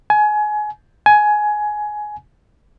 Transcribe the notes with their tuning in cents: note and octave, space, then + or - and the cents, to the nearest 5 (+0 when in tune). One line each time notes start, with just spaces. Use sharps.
G#5 +25
G#5 +15